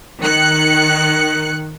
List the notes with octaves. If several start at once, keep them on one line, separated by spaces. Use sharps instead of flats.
D#3 F#6 C#7